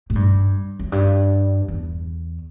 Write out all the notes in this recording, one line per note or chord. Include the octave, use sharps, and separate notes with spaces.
A2
G2
F#2
G2
E2